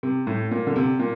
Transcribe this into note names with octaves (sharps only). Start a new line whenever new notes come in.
C3
A2
A#2
D3
C3
A#2